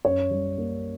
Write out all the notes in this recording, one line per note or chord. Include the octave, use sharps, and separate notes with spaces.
F#2 C#5
G3
A#3